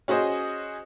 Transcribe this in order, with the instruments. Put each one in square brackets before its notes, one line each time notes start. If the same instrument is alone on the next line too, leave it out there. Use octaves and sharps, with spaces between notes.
[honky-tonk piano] C#4 F#4 G#4 C5 D#5